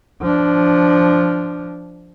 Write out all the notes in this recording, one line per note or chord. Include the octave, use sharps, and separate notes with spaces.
F3 D4